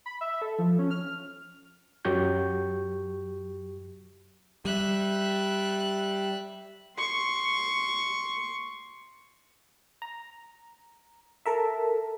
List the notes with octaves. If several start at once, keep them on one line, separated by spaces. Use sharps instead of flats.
B5
E5
A4
F3
C#4
F6
F#2 F#3 G4 C#6 G6
G3 E5 F#6
C6 C#6
A#5
A4 A#4 E5